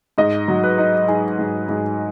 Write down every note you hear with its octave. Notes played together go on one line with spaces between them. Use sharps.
G#2 D#5
F#3
B4
D#4
D#4 G#4
G#2
G#2